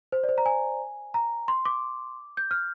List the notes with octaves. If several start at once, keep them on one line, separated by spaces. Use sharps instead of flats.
C5
D5
C5
A#5
G#5
A#5
C6
D6
G6
F6